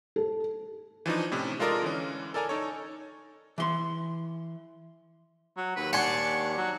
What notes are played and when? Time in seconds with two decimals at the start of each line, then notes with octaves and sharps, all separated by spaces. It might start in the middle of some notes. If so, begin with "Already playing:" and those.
0.16 A4
1.06 E3 F3 D4 D#4
1.32 A2 C3 C#4
1.59 G#3 F4 A4 A#4 D5 D#5
1.82 D3 E3 C#4
2.34 A4 A#4 D5 G#5 A#5
2.49 D#4 A4 C#5
3.58 E3 C6
5.57 F#3
5.76 D#2 B4
5.93 D4 F#5 G#5 C6 C#6
6.57 F#3